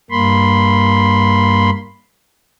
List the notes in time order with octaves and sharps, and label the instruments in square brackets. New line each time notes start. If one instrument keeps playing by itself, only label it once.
[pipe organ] G2 A#3 B5 C6